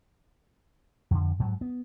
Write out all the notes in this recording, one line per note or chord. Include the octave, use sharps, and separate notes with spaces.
F2 D3
G#2 F#3
B3